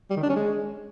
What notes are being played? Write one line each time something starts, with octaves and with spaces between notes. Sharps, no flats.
G3
D#3
D4
C#4
G#3